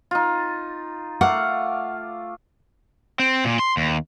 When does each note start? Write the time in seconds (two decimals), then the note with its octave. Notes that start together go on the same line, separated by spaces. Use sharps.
0.11 D#4 F4
1.21 A3 F5 F#5 D6
3.20 C4
3.44 A#2
3.59 C6
3.77 D#2